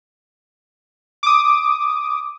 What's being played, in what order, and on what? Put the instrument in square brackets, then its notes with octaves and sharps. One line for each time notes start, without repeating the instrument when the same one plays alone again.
[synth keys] D6 D#6